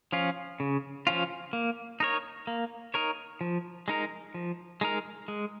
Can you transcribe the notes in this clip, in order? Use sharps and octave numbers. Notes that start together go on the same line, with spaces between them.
F3 C#4 F4
C#3
F3 C#4 F4
A#3
D#4 A#4 C#5
A#3
D#4 A#4 C#5
F3
G#3 D#4 A#4
F3
G#3 D#4 A#4
G#3